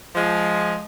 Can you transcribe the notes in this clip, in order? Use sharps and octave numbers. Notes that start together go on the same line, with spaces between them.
F3 G#3